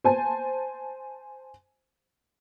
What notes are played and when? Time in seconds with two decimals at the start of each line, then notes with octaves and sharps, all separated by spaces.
0.04 C5 G#5 A5